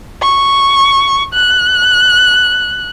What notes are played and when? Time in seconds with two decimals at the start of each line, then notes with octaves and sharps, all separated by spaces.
0.22 C#6
1.33 F#6